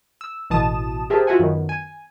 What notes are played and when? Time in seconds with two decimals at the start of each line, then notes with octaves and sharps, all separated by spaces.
0.21 E6
0.50 A1 B2 E3 A5 D#6 E7
1.10 G4 G#4 A#4 C5 E5 A5
1.27 F4 F#4 E5 F#5 G#5
1.39 F#2 D#3 B3
1.69 G#5